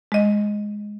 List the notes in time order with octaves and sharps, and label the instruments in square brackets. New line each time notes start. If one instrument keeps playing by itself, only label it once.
[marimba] G#3 D#5